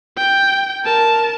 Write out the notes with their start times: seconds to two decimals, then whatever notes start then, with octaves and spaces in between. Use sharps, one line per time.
0.17 G5
0.84 A#4 A5